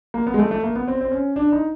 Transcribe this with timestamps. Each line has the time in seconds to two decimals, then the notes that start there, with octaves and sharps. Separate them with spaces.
0.14 A#3
0.27 B3
0.34 G#3
0.39 A3
0.51 A3
0.63 A#3
0.75 B3
0.88 C4
1.01 C4
1.12 C#4
1.36 D4
1.52 D#4